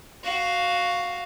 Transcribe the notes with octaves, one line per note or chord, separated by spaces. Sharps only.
F#4 F5